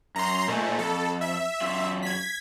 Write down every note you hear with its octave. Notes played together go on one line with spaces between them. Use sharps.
F#2 A#5 C6
A#2 A3 C5 D#5 G#5
F2 A4
E5
F#2 F4
G#6 B6